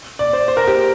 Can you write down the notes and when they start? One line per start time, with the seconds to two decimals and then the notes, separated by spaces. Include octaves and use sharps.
0.19 D5
0.33 C5
0.48 C5
0.57 A#4
0.67 G4